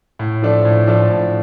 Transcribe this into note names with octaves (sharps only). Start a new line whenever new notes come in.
A2
F3 A3 D4 A4
A2
F3 A3 D4 A4
A2